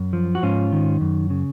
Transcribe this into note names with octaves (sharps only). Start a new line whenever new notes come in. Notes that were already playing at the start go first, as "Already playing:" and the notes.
Already playing: F#2
F3
F#4
G#2 C#4 F4
D#3
F#2
C#3